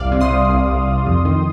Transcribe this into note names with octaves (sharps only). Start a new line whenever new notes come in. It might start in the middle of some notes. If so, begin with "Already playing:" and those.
Already playing: C2 G3 D5 F5
C3
C6 D#6
C3
C2
C2
C2
F2
D#3